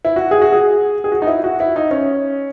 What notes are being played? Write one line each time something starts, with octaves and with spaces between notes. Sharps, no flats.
E4
F#4
G#4
F#4
G#4
G#4
F#4
D#4
E4
F#4
E4
D#4
C#4